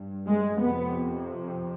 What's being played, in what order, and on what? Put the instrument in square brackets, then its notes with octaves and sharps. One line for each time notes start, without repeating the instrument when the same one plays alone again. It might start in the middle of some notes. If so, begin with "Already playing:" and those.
Already playing: [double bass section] G2
G#3
F2 C3 B3